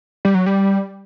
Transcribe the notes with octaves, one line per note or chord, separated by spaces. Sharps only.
G3
F#3
G3